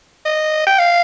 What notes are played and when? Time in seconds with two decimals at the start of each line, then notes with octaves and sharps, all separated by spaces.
0.25 D#5
0.67 G5
0.79 F5